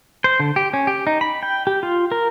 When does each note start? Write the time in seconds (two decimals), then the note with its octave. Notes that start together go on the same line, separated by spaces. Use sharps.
0.24 C5
0.40 D3
0.56 G4
0.73 C#4
0.87 G4
1.07 D#4
1.21 B5
1.43 G5
1.67 G4
1.83 F4
2.12 A#4